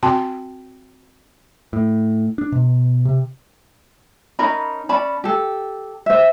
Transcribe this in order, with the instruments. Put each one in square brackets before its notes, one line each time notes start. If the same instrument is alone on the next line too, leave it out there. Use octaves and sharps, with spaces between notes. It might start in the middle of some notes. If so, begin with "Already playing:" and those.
[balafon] C4 F#4 G5 A5 C6
[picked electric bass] A2
D4
B2
C3
[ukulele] C#4 D#4 A#4 B5
C#4 D5 A5 B5
G4 A4
C5 E5